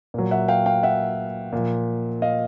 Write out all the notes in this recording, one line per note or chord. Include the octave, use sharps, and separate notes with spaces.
A#2 F#3
E5 F#5
F5 G5
F5 G5
E5 F#5
A#2 F3
D#5 F5